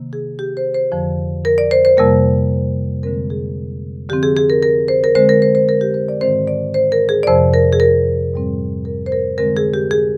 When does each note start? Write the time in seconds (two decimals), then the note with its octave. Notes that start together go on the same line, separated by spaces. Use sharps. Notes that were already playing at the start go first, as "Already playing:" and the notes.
Already playing: C3 D#3 A#3
0.13 G#4
0.39 G4
0.57 C5
0.74 C5
0.92 F2 D3 F3
1.45 A#4
1.58 D5
1.71 C5
1.85 C5
1.97 F2 C3 G3 A#3 A#4
3.03 D3 G#3 C4 A#4
3.30 G#4
4.09 D3 F3 C4 G4
4.23 G#4
4.37 G#4
4.50 A#4
4.63 A#4
4.88 C5
5.04 A#4
5.15 D3 G#3 C4 C5
5.29 A#4
5.42 C5
5.55 C5
5.69 A#4
5.81 G4
5.94 C5
6.08 D5
6.21 G#2 D#3 G#3 C4 C5
6.48 D5
6.74 C5
6.92 A#4
7.09 G#4
7.23 D5
7.27 F2 C3 F3 C5
7.54 A#4
7.72 G#4
7.80 A#4
8.33 G#2 G3 C4
8.85 A#4
9.06 C5
9.12 A#4
9.38 D3 G#3 C4 A#4
9.57 G#4
9.74 G4
9.91 G#4